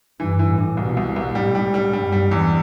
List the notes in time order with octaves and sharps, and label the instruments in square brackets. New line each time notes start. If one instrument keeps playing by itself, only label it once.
[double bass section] G2 [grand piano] E3
[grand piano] E3
[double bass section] A2
[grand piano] E3
[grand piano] C2 [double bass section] B2
[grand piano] C2
C2
[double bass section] A2 [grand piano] G3
[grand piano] G3
G3
[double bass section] G2 [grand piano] G3
[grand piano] G3
E2